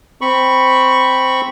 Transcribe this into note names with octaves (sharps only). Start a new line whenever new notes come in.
C4 B5 C#6